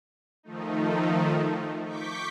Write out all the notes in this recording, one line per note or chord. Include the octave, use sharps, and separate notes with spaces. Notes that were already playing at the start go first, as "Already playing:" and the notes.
D#3 F3 A3 D#4
C#6 D6 G6 B6